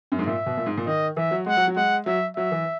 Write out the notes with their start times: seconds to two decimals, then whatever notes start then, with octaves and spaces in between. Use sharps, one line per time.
0.12 F#2
0.19 G#2
0.26 A#2 E5
0.46 B2
0.57 A#2
0.66 G#2
0.77 A#2
0.87 D#3 D#5
1.17 E3 E5
1.31 F#3
1.46 G#3 F#5
1.57 F#3
1.67 F#3
1.76 G#3 F#5
2.06 F#3 E5
2.37 F#3 E5
2.52 E3